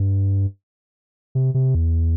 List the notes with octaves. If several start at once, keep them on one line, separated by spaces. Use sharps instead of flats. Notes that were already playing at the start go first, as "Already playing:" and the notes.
Already playing: G2
C3
C3
E2